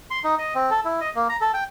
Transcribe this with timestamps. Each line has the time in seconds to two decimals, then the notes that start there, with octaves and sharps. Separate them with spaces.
0.10 C6
0.24 D#4
0.38 D#5
0.55 C4
0.70 A4
0.84 E4
1.01 D#5
1.16 A#3
1.29 A#5
1.41 A4
1.54 G5